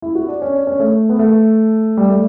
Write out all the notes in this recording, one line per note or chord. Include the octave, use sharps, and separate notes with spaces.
E4
F#4
D4
C#4
D4
C#4
A3
B3
A3
G3
A3